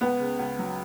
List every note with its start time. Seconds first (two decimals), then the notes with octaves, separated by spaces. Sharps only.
0.01 C#2 B3 B4
0.20 C#3
0.39 C#2
0.59 F#3